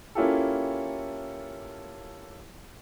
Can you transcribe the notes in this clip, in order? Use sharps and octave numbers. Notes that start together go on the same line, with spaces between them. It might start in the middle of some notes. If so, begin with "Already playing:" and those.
A#3 C#4 E4 F4 G4 A4